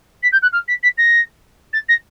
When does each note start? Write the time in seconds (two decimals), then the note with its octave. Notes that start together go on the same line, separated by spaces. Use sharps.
0.23 B6
0.32 G6
0.42 F#6
0.52 F6
0.68 B6
0.83 B6
0.98 A#6
1.73 A6
1.89 A#6